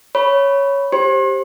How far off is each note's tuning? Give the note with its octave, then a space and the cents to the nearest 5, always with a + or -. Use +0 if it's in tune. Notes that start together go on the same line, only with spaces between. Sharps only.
C#5 +0 B5 +0
G4 +0 C5 +20 C6 +45